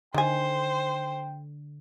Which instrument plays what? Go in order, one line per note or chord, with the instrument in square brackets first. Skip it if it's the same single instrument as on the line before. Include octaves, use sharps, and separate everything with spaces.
[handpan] D3 [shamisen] D#3 G#5 [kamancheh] C5 [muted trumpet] G5